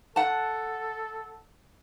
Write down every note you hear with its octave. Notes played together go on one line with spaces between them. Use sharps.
A4 F#5 A5